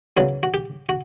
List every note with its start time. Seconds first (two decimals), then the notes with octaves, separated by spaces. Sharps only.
0.17 E2 C#3 F#3 F#4
0.43 F#4
0.54 G4
0.89 F#4